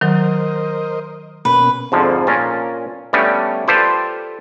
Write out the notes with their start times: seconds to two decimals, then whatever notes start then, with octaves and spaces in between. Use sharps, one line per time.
0.01 D#3 F#3 A#4 C5 D#5
1.45 B2 A#3 C#4 B4
1.92 F2 G#2 D3 F3
2.27 A#2 C#4 A#4 F5 G#5 A5
3.13 G3 A3 B3 C#4 D4
3.68 F4 G4 A4 B4 C5 D5